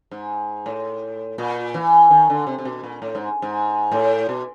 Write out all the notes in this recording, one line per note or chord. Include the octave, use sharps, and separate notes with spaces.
G#2
A2
A#2
E3
D#3
D3
C3
C3
B2
A#2
A2
G#2
G#2
A2
B2